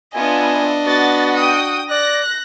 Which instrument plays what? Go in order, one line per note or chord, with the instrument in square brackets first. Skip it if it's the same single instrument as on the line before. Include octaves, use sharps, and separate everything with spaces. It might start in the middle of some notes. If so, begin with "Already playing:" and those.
[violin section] B3 F4 E5 [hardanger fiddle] D4 D#5 [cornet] G#5
[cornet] B3 [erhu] F#4 [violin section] A6
[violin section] G5 D#6
[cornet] D5 [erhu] F#6 [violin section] A#6